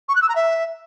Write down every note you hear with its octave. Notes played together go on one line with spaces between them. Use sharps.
C#6
F#6
E6
A#5
E5